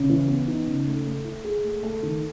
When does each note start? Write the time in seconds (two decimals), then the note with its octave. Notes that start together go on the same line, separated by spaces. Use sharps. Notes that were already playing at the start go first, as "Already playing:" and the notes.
Already playing: C#3
0.09 E3
0.28 B3
0.48 D#4
0.67 C#3
0.87 A3
1.06 A3
1.25 E4
1.44 G#4
1.64 A3
1.83 A3
2.03 D#3